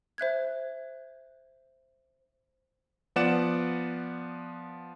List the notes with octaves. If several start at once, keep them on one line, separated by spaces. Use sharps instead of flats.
C5 E5 F#6 G#6
F3 B3 D5 F#5 E7